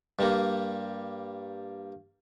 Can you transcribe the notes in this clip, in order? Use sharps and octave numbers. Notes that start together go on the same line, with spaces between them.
G2 G3 A#3